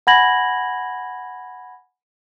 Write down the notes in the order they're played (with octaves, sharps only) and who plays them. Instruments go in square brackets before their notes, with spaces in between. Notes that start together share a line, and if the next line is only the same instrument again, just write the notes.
[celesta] F#5 G#5 B5 G#6 A#6 F#7